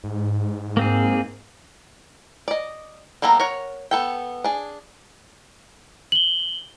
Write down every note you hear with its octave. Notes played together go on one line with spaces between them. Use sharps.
G#2
A#3 C4 G#4
D5 D#5
G3 A#3 B3 A4 A#5
A#4 C#5 F#5
B3 A4 G5
D4 G#4
F#7 G7